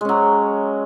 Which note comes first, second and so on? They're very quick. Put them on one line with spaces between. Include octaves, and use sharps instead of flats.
G#3 C#4 F#3